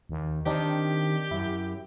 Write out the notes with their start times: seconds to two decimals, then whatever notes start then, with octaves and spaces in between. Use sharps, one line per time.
0.09 D#2
0.46 D#3 C4 D4 D#4 G4
1.31 F#2 E4